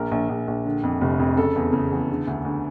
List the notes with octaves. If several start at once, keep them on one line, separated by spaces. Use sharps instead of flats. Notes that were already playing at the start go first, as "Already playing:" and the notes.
Already playing: A#1 A#3 A#4
A#1
A#1
A#1
D3
F2
F1
F2
C#3 A4
E2
C#3
E2
D3
D2
D2